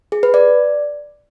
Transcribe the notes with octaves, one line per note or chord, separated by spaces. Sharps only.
G#4
B4
D5